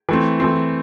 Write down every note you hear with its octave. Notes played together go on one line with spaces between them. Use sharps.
E3 A3 C4
E3 A3 C4